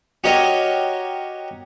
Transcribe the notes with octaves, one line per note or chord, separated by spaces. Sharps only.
F#4 G4 A#4 C#5 D#5